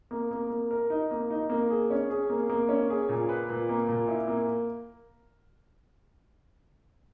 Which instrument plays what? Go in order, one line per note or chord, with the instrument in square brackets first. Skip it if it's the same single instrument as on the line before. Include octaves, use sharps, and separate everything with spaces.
[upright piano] A#3
A#3
A#3
A#4
D#4
A#3
D#4
A#3
G#4
C#4
G#4
A#3
A#3
C#4
G#4
A#2
B4
A#2
A#3
A#2
E4
A#3